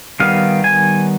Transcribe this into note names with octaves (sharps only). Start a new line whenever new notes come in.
D#3 G3 B3 F5
G#5